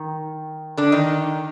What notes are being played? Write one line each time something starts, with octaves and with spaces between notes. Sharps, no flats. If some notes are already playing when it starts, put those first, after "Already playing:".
Already playing: D#3
D3 D4
D#3 D#4